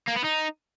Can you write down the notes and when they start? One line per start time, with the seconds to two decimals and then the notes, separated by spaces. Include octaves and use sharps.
0.08 A#3
0.16 B3
0.25 D#4